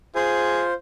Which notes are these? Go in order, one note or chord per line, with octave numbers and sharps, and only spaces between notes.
F4 G#4 C5